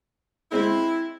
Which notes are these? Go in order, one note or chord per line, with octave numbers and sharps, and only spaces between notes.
G#3 C4 E4